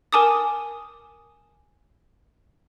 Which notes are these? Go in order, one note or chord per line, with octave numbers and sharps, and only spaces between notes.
A#4 G#5 A5 D6 D#6